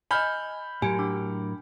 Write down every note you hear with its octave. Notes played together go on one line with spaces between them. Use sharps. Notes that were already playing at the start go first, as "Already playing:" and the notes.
D#5 G#5 B5 F6 G6
A2 F#3 G4 A#4 G#5 D7
D4 D6